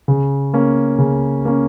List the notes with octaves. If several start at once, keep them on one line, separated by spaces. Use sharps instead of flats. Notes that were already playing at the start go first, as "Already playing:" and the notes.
C#3
A#3 C#4
C#3
A#3 C#4